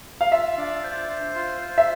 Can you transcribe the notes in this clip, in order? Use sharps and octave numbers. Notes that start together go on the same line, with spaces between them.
F5
F4 E5
D4
C5
C5
F4
C5
E5